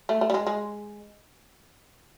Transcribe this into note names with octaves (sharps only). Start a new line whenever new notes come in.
A3
A3
G3
G#3
G#3